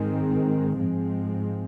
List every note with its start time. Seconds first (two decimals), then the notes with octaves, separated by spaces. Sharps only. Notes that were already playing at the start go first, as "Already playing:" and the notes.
Already playing: G#2 D#3 G#3 C4
0.77 G#2 F3 G#3 C4